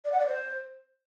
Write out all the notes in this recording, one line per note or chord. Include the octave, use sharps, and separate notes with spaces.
D5
F#5
D5
C5